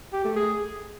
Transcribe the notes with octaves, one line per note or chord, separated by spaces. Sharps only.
G4
A3
G#4